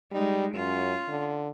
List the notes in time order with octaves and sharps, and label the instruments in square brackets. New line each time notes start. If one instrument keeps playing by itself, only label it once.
[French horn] G3 [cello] G#3 D#4
[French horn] F#2 [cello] C#4 F4
[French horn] D3